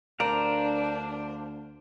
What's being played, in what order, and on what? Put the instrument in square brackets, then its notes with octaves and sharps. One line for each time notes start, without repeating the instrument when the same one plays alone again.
[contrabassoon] D2 [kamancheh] D4 [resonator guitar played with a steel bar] A#4 [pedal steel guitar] C5 D5 F5